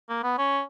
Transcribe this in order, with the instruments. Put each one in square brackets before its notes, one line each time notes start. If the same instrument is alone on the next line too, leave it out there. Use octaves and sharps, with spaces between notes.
[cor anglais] A#3
B3
C#4